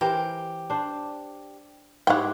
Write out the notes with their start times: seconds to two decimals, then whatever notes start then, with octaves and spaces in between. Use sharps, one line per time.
0.01 E3 G4 A#4 C5
0.70 D4 C5
2.07 G#2 E4 G4 C#5 F#5 G5 C6